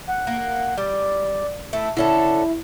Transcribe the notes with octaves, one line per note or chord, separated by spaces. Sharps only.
F#5
A#3
G3 D5
A3 E4 E5
D3 C#4 E4 A4